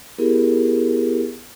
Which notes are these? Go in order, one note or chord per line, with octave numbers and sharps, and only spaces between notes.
B3 E4 G4 G#4 A#4